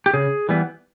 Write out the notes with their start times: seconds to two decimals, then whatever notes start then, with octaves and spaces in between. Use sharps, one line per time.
0.06 G4
0.14 C#3 G#4
0.49 E3 G3 B3